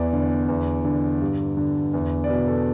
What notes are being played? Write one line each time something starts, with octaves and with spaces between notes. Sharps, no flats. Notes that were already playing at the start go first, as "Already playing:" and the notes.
Already playing: E2 D5
D3
E2
D3
G2
D3
E2
D5
B2 B4
A4